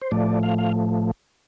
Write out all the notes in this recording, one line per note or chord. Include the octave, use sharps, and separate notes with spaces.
C5
A2 F3 A3 D5
F5
F5